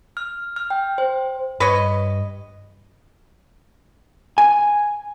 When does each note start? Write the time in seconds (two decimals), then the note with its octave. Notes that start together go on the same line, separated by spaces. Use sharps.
0.17 F6
0.56 F6
0.70 G5
0.98 C5
1.60 G2 B4 C#5 D#5
4.38 G#5